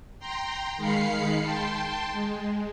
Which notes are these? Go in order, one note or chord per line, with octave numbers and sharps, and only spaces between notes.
G5 A#5 C6
D#3 G#3 F5 B5 C7 C#7
G5 A5 C6
G#3